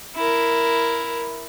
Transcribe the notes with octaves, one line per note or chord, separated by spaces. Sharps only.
E4 A#4